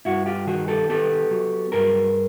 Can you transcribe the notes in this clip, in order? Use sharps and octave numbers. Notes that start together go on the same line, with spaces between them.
G2 E4 F#4
F4 G4
D#3 F#4 G#4
G4 A4
B3 G4 A4
F#3
G2 G#4 A#4